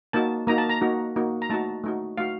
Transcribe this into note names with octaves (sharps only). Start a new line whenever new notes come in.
A#3 D#4 F#4 A5
A#3 D#4 F#4 A#5
A5
A#5
A#3 D#4 F#4
A#3 D#4 F#4
A#5
A3 D#4 F#4 A5
A3 D#4 F#4
A3 D#4 F#4 F5